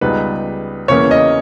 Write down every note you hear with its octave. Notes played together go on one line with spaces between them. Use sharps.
C#2 C#3 G3 B3 D#4 B4
E2 C#3 E3 A#3 C#4 C#5
D#5